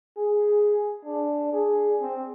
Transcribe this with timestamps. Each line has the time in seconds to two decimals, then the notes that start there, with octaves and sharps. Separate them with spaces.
0.17 G#4
1.05 D4
1.53 G#4
2.01 C4